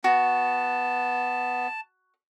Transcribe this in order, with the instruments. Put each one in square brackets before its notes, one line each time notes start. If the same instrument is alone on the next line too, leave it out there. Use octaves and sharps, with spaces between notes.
[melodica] B3 [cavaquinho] F#4 [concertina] A5